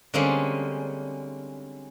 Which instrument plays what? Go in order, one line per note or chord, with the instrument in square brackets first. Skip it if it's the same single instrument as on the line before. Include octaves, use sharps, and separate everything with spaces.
[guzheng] D3 G3 G#3 A#3 C4 C#4